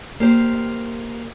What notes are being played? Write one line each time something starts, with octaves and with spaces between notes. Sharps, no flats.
A#3 G4 C5